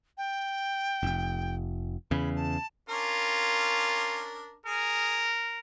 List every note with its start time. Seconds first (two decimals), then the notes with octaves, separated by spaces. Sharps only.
0.18 G5
1.03 F1
2.11 E2 C#3 B5
2.36 A5
2.89 C#4 D4 F4 A#4
4.66 G#4 A#4